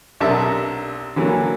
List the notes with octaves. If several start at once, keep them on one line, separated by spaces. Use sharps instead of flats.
B1 C3 D4 A#4 E5 A5
D3 E3 F#3 A#3